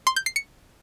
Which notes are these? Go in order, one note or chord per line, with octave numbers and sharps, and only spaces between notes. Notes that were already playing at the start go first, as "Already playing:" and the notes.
C6
G6
C7
C#7